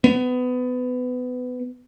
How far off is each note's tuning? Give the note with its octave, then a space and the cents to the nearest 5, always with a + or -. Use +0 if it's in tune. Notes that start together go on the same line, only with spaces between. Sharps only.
B3 +20